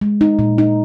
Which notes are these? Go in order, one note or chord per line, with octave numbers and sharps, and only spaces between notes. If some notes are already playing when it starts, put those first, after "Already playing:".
G#3
D#4
A#2
D#4